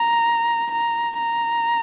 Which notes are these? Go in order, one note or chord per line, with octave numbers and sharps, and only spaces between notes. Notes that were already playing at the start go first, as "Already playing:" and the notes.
Already playing: A#5
A#5
A#5